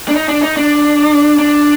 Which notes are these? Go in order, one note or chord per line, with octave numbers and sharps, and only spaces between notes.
D4
D#4
D4
D#4
D4
D4